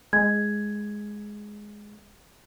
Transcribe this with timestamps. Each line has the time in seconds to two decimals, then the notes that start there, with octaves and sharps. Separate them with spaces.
0.13 G#3 G#6